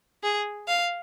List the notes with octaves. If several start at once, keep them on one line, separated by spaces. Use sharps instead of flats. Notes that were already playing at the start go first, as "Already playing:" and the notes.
G#4
F5